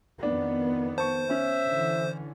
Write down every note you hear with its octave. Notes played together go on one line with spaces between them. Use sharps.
F2 D#3 B3 D4
C5 A5 C#6
C#4 E5
D3 E3